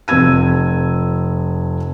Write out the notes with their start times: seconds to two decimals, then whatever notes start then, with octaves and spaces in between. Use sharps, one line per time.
0.08 F1 F2 E6 G#6 D#7